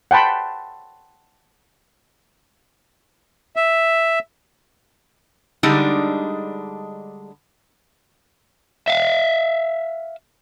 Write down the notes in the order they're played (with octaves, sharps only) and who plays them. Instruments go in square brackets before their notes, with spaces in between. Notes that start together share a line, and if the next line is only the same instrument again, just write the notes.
[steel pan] F#5 G5 A5 B5 C6
[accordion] E5
[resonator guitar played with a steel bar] D3 G3 G#3 D4 D#4
[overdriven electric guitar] E5 F5